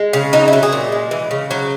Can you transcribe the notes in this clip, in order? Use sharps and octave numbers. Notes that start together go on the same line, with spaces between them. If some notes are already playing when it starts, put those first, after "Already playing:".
Already playing: G#3
C#3
F#3 D#4
E4
F#3
G#4
A#2
G#3
E3
C#3
F#3